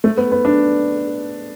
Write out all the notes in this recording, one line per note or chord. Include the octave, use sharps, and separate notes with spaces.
A3
B3
B3
D4